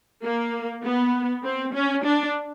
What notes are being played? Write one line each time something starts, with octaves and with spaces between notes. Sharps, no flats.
A#3
B3
C4
C#4
D4